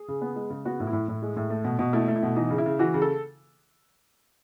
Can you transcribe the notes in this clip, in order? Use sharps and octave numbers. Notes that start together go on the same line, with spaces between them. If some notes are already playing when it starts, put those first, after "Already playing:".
Already playing: G#4
C#3
B3
G#3
C#3
B3 F#4
A2
E4
A2
A2
G#3
A2
A3
B2
B2
A3 E4
A3
E4
B2
E3 D#4
C#3
E4
C#3
E3 F#4
C#3
A4